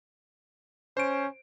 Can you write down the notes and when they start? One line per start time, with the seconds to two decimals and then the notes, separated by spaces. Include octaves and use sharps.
0.97 C#4 C5 D7